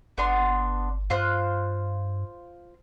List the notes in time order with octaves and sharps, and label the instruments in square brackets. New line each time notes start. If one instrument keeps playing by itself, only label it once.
[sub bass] G1 [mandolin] B3 D4 C6
[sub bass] G2 [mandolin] F4 C5 F#6